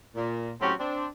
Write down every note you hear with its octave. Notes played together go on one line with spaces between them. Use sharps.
A#2
A2 F#3 C4 C#4 F#4 G4
C4 D4